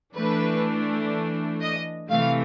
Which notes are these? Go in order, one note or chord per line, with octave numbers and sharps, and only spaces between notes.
E3 A3 D4 B4
D#5
C3 E3 A3 F5